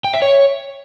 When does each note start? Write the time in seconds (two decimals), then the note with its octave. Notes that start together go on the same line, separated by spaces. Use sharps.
0.04 G5
0.13 E5
0.22 C#5